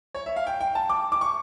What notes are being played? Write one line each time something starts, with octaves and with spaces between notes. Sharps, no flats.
C#5
E5
F5
G5
G5
A5
D6
D6
C#6